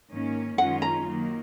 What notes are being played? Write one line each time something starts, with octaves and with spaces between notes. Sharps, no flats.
G#2 D#3 A#3 C#4
F#2 D#3 G#3 C#4 F4 F#5
A#5
D#3 F#3 A#3